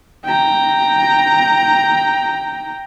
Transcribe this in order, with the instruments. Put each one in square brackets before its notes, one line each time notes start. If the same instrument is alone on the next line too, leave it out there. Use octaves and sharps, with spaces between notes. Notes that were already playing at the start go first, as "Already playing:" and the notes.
[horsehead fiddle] G5 A#5